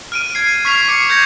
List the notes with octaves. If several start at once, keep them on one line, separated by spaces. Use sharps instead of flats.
F6 D7 D#7
G#6 C7
C#6 F6 B6 C7 F7
C#6 D6 C7 C#7
G6 G#6 A#6 C#7